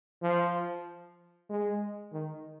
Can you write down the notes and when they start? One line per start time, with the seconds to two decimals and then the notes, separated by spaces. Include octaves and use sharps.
0.22 F3
1.50 G#3
2.13 D#3